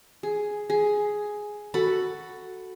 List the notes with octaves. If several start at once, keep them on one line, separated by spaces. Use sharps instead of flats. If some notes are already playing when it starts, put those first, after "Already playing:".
G#4
G#4
F#4 A4 B5